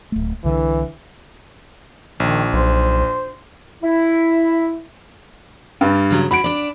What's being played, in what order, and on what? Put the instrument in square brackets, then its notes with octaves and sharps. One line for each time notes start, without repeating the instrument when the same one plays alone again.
[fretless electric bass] D1 A3
[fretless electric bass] C2 D3 [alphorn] E3
[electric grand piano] A#1 [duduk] D#3
[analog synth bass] B1 [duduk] C5
[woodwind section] E4
[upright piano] G2 G3
[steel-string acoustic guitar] C#3 F#3 C#4
[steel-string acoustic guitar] C#4 F#4 [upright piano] B5 D7
[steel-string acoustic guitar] D4 D5